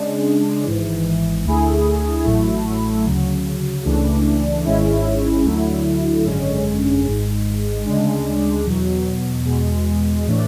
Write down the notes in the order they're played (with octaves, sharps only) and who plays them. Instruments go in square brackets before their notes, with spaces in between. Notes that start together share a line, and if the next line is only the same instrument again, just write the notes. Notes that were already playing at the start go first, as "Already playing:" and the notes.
Already playing: [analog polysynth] C#3 G#3 D4
G#1 G#2 E3
D2 D3 A3 E4 G#4
A1 A2 F#3 A3 E4
D2 C#3 F#3
C#2 C#3 E3 A3 D4
G#1 G#2 G#3 C#4 E4
D2 D3 F#3 A3 E4
G#1 F#2 D3 G#3 C#4
G#1 G#2 G#3
D2 C#3 G#3 D4
E2 B2 F#3
E2 B2 G#3
A2 E3 A3 D4